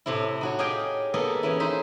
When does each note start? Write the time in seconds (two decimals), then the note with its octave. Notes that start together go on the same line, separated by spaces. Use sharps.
0.06 A2 C3 E4
0.41 D#4 F#4 C#5
0.59 G4 G#4 C#5 D#5 F5 G5
1.14 A#3 B3 G#4 A4 D#5
1.43 E3 C#4 E4
1.60 D#4 C5 E5